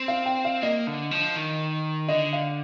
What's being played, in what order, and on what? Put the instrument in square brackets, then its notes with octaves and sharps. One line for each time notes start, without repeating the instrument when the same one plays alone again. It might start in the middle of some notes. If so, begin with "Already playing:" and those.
Already playing: [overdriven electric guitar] C4
[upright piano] F5
G5
F5
[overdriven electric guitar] A#3 [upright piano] D#5
[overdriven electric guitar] D3
F3
D#3
[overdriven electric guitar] D3 [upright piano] D#5
[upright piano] F5